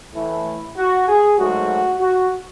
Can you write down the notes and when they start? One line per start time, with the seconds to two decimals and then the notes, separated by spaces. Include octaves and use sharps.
0.14 A2 E3 A3 E4
0.76 F#4
1.07 G#4
1.37 G#2 F#3 A3 F#4
2.00 F#4